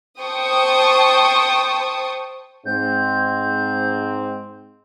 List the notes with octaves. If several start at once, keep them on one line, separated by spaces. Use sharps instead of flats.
C5 G5 A5 C#6 D#6
G#2 C4 G6